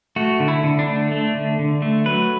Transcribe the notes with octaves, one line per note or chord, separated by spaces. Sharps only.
A3 F#4
D3
E4
D3
D4
A3
A3
D3
D3
A3
F#3 B4